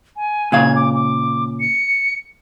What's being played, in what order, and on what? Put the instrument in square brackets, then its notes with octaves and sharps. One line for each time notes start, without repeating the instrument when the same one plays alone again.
[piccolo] G#5
[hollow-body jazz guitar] A#2 C#3 F5 [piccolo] G#6
[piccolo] D6
D6
C#7